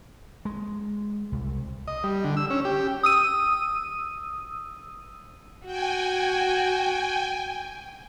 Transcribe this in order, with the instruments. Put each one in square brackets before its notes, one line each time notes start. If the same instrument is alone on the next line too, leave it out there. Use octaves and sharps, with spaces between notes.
[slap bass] G#3
C2
[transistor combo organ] D#5
G3
D3
E6
C#4
G4
[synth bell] D#6 E6 D#7
[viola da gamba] F#4 [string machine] G5 G#5